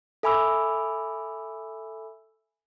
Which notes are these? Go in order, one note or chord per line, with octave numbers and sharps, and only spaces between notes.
A4 E5 G#5 B5 D6 E6